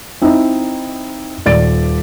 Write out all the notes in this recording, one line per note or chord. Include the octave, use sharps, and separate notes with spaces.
C4 D#4 E4
D#1 D5 A6 D7